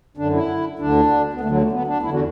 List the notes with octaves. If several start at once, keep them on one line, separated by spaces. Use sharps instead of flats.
F#2 D3 D4
E4
D2 D3 D4
B3
D2 D3 A3
F#3
A3
B3
D4
E2 D3 E4
F#4